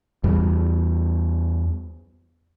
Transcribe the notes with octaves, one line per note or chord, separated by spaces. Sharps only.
E2 G3